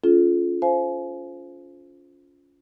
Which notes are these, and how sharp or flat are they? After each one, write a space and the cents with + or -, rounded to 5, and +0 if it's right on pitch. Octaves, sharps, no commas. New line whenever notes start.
C#4 +25 F4 +0 A4 -35
C5 +0 F5 -25 G#5 +35